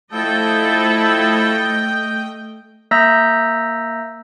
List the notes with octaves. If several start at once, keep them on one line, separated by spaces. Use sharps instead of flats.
F3 A3 E4 A4 D#5 G5
A#3 E5 A#5 E6 G6 A#6